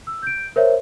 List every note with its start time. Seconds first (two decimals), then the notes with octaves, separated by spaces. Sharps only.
0.07 E6
0.23 G6 D7
0.56 A#4 C5 C#5 E5